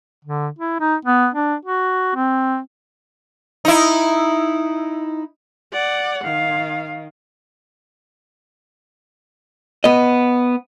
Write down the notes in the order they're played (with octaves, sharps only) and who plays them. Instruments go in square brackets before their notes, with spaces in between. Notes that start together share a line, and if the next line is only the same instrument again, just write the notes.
[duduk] D3
E4
D#4
B3
D4
F#4
C4
[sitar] D#4 E4
[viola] D5 F#5
[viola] D#3 [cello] F5
[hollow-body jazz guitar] B3 D#5